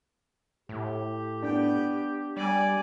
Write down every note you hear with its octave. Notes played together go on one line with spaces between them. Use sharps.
A2 G4
B3 D4 G5
G3 D5 G#5